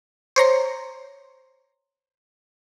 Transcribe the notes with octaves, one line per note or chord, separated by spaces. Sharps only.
C5 C#5 A#5 C6